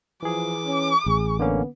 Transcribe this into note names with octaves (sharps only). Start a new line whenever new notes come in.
E3 F3 G#4 D6
C#4
A1 G#4
D3 A#3 B3 C#4